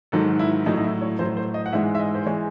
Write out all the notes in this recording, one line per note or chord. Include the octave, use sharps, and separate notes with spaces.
G#2 D#3 F#3 A4
E4
A2 F#3 D#4
D#4
E4
C#5
A2 F#3 C5
C5
D#5
F#5
G#2 E3 G#3 E5
E5
D#5
C5
E3 G#3 C#5